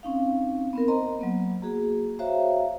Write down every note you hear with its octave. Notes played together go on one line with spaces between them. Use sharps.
C4 C#4 D#4 F5
B3 C4 A#4
C5 D#5 A#5 C6
F#3 A#3 B3
A#3 F#4 G#4
F#4 C5 C#5 E5 F5 A#5